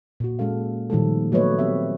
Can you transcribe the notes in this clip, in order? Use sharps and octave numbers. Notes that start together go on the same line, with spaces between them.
A#2 F#4
A#2 G#3 C#4 A4 F5
A#2 D#3 F3 G3 A3 A4
F#3 A3 B3 B4 C#5 D#5
B3 C4 G4 E5